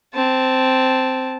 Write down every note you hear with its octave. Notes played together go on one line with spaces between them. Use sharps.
C4 A5